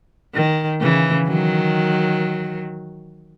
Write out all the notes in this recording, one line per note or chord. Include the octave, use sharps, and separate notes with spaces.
D#3
C#3 E3
D#3 F#3